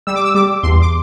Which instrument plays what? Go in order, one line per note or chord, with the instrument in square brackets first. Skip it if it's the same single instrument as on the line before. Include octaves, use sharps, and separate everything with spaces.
[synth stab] G3 E6
D6
E6
G3 D6
E2 C6
D6